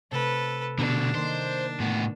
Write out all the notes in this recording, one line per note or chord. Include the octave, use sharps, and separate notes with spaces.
C3 A3 A4 B4
B2 D3 D4
D#3 G3 A#3 C5
A2 B3